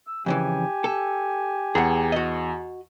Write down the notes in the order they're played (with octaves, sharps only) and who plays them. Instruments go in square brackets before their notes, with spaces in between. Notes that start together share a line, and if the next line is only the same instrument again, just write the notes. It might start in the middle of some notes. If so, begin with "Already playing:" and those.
[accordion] E6
[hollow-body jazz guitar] F2 C#3 E3 [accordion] G4 G#5
[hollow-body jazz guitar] A4
[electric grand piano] E2 [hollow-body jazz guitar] G#4 F#5
[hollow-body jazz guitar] F#4 D#5